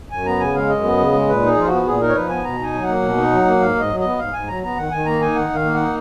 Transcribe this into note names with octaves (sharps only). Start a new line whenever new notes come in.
F#2 G#5
B3 A#5
C#3 G#5
G#3 F5
F#2 D#5
B3
C#3
G#3
A#2 B4
D#4
G#4
F3 F4
B3 F#4
A#2 G#4
D#4 A#4
C#5
F3 B4
B3 G#5
B2 A#5
D#4 G#5
F#3
A#3 F#5
B2
D#4
F#3
A#3
G#2 F5
G#2 D#5
F#3
B3 D#5
G#2 F5
G#2 G#5
F#3 A#5
B3 A#5
D#3 F#5
D#3 G#5
A#3 A#5
D#4 G#5
D#3 F#5
D#3
F5
A#3
D#4 F#5